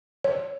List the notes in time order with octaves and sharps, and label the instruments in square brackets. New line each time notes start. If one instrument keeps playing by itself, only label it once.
[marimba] C#5